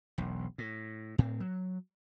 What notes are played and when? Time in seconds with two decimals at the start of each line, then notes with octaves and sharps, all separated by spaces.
0.18 E1 B1
0.58 A2
1.18 A2 C4
1.40 F#3